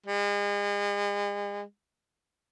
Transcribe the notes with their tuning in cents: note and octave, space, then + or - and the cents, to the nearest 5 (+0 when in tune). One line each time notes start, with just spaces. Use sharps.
G#3 -40